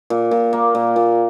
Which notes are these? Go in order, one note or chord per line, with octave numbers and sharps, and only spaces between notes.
A#2
A#2
A#3
A#2
A#2